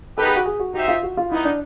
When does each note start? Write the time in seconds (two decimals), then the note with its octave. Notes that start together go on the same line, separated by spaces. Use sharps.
0.17 B3 D#4 G4 A4 B4
0.27 G#4
0.36 F#4
0.46 G#4
0.60 F#4
0.74 D#4 F#4 G4 C5 E5
0.88 F4
1.03 F#4
1.17 F4
1.31 G3 B3 D#4 E4
1.45 D4